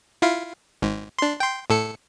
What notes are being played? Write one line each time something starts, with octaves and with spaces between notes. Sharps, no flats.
E4 F4 F5
G#1 G#2
D4 C6
G5 C6
A2 A4 C#7